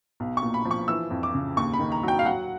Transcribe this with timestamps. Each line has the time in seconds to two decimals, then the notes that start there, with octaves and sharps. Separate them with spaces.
0.20 B1
0.37 C#6
0.42 A#2
0.54 B5
0.65 F3
0.71 C#6
0.88 E3 E6
1.10 F2
1.23 D6
1.34 C#3
1.57 D#2 C#6
1.73 B5
1.79 D#3
1.92 A#5
2.03 F#3 G5
2.19 F5
2.25 F#3 F#5